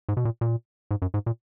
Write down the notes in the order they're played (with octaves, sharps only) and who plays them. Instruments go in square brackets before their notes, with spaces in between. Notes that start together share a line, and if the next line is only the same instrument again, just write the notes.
[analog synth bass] G#2
B2
A#2
A#2
G#2
F#2
G#2
A#2